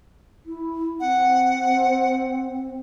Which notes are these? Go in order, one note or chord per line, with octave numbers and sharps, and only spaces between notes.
E4
C4 F#5